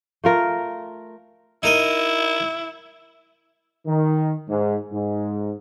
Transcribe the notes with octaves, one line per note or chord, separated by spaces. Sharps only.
A3 F4 A#4
D#4 E4 A#4 D#5
D#3
G#2
G#2